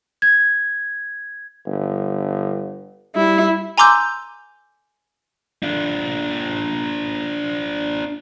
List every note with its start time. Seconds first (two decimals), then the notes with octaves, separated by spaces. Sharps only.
0.22 G#6
1.66 G1
3.16 G3 E4
3.78 G#5 A#5 C6 D6 E6 G6
5.63 D4 F4